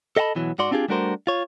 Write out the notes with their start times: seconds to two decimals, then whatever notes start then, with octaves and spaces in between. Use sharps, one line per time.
0.17 A4 D#5 F5 F#5 A5 B5
0.35 B2 E3 F#3
0.59 G#2 F#4 D5 C6
0.71 C4 D4 F4 G4 G#4
0.88 G3 A3 D4 F#4 A#4 C5
1.27 F4 C#5